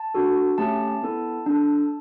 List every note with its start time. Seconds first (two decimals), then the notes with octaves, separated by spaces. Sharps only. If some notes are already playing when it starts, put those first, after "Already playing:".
Already playing: A5
0.14 D4 F#4 A4
0.58 A3 C#4 G4 A5
1.02 B3 E4 A4
1.46 D4 A4